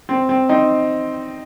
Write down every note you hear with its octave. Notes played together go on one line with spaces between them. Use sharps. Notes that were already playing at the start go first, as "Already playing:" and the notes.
C4
C4
C4 D#4